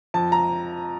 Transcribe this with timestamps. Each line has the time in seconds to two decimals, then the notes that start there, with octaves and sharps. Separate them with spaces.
0.14 F2 A5
0.32 A#5